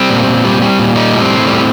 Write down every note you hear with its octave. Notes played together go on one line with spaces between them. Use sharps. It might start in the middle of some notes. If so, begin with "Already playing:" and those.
Already playing: G3 C4
A#2
A#2
G3
G3
A#2
G3 D#4
A2
C4
A2
G3